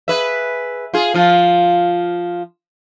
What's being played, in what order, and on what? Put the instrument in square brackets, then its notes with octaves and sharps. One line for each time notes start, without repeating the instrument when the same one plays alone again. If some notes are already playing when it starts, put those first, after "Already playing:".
[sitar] G#4 B4 E5
F4 G#4
F3 F4